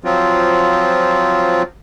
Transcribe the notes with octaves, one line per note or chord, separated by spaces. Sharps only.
F3 F#3 C4 F4